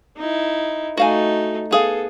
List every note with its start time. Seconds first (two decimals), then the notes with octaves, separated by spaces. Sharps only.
0.17 D#4 E4
0.97 A3 D#4 F#4 F5 G#5
1.71 B3 G#4 A4 F5